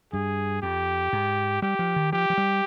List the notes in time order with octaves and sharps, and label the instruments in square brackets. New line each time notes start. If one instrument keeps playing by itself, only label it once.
[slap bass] G2 [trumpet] G#4
[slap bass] F2 [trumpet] G4
[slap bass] G#2
[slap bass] G3 [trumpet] G4
[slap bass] F3
D#3
[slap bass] F3 [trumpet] G4
[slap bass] F3
G3